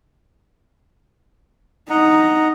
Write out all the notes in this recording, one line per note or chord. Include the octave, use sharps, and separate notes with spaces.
D#4 D#5 F#5 A#5